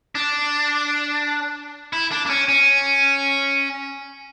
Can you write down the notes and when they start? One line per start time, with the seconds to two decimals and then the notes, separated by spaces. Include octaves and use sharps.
0.15 D4
1.93 E4
2.12 D4
2.26 D4
2.30 C#4
2.49 C#4